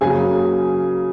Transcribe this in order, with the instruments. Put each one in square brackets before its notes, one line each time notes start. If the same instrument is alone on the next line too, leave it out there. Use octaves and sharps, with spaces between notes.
[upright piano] C#3 F#3 A#3 G#4 G#5